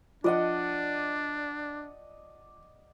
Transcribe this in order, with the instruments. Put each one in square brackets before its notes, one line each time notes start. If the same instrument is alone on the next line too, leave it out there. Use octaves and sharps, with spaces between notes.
[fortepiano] F3 [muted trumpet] D4 [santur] D5 D#5 F#5